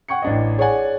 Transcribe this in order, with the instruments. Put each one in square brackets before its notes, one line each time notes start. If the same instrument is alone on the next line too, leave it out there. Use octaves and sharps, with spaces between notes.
[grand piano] F#5 G5 C#6 G#6 C#7
A1 D4 D#5
G#4 C#5 D5 F#5 G#5